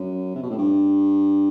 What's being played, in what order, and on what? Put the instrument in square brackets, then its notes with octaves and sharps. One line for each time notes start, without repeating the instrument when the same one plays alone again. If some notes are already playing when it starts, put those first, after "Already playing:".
Already playing: [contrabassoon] F#2
C3
B2
A2
G2